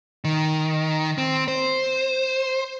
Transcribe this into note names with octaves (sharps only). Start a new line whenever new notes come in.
D#3
C4
C5